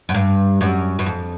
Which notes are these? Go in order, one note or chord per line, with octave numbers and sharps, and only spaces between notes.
F#2
G2
F#2
F#2
F2